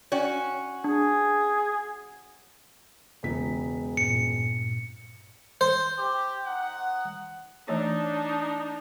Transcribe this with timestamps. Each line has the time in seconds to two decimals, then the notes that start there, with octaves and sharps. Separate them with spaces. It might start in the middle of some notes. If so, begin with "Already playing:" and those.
0.12 C#4 F#4 C#5 D5 G5
0.84 D4 G#4
3.23 E1 C#2 B6
3.97 G2 A#2 C#7
5.61 C5
5.99 G4
6.45 D#4 F#5
7.68 E3 A3 D4 D#4 C#5